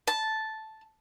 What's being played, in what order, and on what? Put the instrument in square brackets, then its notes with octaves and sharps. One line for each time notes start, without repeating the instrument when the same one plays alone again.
[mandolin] A5